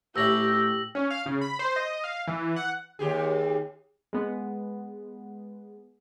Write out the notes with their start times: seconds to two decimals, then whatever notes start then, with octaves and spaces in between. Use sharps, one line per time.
0.16 A1 G4 C#5 E5 E6 A#6 F#7
0.95 C#4
1.11 F5
1.26 C#3
1.41 B5
1.59 C5
1.76 D#5
2.04 F5
2.28 E3
2.56 F#5
2.99 D#2 G4 G#4
4.13 G#3 B3